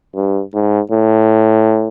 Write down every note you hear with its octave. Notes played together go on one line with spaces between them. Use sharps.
G2
G#2
A2